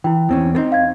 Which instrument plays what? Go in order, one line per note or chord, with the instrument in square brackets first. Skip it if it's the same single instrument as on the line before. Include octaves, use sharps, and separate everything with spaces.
[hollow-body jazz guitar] E3 [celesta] E4 G5
[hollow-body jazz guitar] E2 C4 C#4
B3 C4 D#4
[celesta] F5 G#6